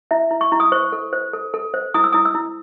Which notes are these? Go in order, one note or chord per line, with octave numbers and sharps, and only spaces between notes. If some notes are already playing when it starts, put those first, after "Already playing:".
E4 E5
E4
C#6
E4
D#6
C5 C#6
A4
C5
A4
A4
C5
E4 D#6
E6
E4 D#6
E6
E4